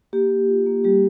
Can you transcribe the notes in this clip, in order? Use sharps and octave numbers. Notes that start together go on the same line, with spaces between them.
A#3 G4
A#3
F4
A#3
G3 G4